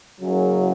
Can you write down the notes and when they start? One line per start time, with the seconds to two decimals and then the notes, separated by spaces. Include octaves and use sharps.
0.21 F#1 F#2 C#3 F#3